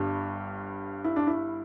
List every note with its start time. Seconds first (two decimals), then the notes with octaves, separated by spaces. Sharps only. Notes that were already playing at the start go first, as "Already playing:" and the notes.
Already playing: G1 G2 G3
1.04 E4
1.16 D4
1.27 E4